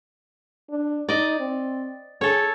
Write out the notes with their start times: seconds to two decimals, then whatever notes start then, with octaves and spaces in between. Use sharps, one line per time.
0.70 D4
1.09 D#4 D5 D#5
1.40 C4
2.21 G#4 A4 C#5